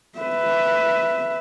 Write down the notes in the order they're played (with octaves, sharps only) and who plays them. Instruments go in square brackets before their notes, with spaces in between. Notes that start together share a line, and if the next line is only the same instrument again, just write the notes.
[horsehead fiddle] B4 E5